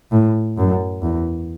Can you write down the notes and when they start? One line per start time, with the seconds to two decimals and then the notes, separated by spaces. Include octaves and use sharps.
0.11 A2
0.57 F#2
1.02 E2